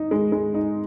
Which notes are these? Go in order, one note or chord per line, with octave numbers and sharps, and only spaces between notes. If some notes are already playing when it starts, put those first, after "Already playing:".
Already playing: D#4
G#3
G#3
D#4